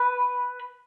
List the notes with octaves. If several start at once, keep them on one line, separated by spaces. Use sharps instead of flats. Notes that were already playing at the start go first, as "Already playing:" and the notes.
Already playing: B4